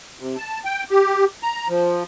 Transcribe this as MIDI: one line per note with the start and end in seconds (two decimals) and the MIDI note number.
0.19 0.37 48
0.37 0.60 81
0.65 0.83 79
0.90 1.25 67
1.43 1.68 82
1.68 2.03 53